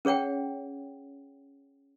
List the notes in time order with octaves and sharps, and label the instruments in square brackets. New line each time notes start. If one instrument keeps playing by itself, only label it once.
[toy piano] C#4 G#4 C#5 F#5 G5